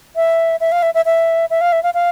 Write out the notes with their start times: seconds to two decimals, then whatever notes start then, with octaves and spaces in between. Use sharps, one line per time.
0.16 E5
0.60 E5
0.72 F5
0.82 E5
0.94 E5
1.05 E5
1.50 E5
1.61 F5
1.72 E5
1.83 F5
1.94 F5